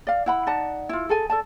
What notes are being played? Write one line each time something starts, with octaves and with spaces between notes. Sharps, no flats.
D5 F5
E4 F#5 B5
D#4 D5 F#5 A5
E4 F4
G#4 A4 G#5
A4 D5 A5